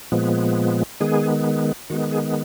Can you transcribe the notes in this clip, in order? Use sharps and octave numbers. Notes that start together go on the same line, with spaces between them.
A#2 F3 G#3 B3
D#3 G#3 B3 G#4
D#3 G#3 B3 F#4
G#4